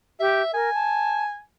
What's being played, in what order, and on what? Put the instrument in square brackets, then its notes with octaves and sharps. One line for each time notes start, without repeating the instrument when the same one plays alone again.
[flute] G4 [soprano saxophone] E5
[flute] A#4 [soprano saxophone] G#5
[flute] A5